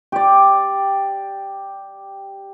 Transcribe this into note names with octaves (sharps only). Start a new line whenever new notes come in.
G4 D5